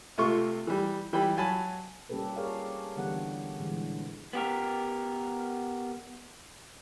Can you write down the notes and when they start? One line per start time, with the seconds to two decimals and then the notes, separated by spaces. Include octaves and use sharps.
0.18 C3 A3 F4 C#6
0.67 E3 G3
1.13 E3 G3 G5 B5
1.37 F#3 G#5 A5 B5
2.09 G3 A#3 C#4 G4 A4 B4
2.36 G#4 A#4 C#5 D5 F5
2.96 D3 E3 G3 B3 A4 F#5
3.60 A#2 D3 E3 G3 G#3
4.33 B3 G4 A#4